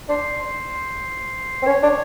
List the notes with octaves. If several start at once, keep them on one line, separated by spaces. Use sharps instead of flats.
D4 C5
C5
C4
C#4 C#5
D4